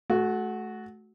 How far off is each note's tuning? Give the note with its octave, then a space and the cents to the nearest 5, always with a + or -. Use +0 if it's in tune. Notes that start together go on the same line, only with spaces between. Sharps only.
A3 -30 F#4 +0